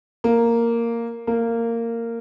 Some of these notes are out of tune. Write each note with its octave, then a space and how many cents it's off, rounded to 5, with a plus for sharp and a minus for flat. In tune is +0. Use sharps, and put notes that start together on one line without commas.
A#3 -5
A#3 -15